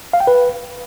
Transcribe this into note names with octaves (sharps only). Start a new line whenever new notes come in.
F5
G5
B4